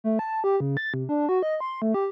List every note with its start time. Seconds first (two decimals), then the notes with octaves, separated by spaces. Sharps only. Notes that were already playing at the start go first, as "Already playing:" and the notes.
0.04 A3
0.19 A5
0.44 G4
0.60 C#3
0.77 A6
0.94 C3
1.09 D4
1.29 F#4
1.43 D#5
1.61 C6
1.82 A3
1.94 G4